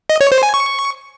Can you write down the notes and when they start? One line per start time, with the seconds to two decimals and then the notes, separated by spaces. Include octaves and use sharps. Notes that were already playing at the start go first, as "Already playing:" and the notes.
0.10 D#5
0.21 C#5
0.32 C5
0.43 G#5
0.54 C#6